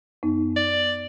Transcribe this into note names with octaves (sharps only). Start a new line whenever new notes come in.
F#2 B3 D#4
D5